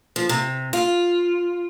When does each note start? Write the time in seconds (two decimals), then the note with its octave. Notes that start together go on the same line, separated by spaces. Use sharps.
0.16 F3
0.29 C3
0.73 F4